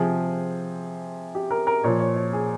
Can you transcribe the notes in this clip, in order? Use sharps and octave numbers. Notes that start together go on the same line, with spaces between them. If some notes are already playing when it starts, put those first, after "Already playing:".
Already playing: C3 F3 G#4
G4
A#4
A#4
A#2 F3 C#5
C#5
C#5
G#4